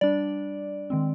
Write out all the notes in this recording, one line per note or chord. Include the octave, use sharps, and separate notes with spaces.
G3 D4 D5
D#3 G#3 C4